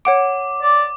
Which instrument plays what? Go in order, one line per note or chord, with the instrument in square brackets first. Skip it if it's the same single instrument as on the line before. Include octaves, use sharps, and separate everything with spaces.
[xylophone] C#5 F#5 D7 [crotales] D6
[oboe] D5